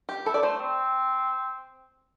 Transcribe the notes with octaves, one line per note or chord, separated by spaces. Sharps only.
G4
E4 A4
D5
A3 C5
C4